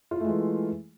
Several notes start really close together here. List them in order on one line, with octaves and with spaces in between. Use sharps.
F4 E4 A3 G#3 E3